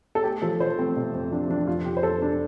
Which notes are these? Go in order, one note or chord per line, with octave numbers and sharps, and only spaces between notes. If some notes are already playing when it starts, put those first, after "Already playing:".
A4
A3 G4
F3 A4
F3 C5
A3 C4
C3
F2
F3 D4
F3 D4
F1 F4
F1 G4
C5
F1 A4
F1 D4